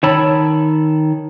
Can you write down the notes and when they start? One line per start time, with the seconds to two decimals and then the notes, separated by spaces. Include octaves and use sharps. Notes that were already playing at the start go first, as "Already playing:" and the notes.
0.03 D#3 C#5 A5 B5 E6